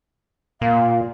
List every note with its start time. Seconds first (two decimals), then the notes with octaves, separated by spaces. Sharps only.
0.61 A#2 F5